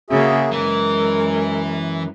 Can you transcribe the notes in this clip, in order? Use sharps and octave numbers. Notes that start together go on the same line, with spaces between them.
C#3 A#3 F#4 G#4 E5
F#2 E3 G#3 A#4